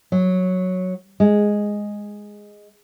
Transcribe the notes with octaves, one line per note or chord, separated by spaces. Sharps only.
F#3
G#3